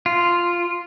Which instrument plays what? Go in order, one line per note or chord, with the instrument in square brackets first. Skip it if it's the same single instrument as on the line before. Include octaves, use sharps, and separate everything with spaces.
[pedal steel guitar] F4